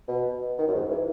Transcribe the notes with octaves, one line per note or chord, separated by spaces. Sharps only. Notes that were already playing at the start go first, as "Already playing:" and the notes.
B2
D#3
F#2
G#2
E3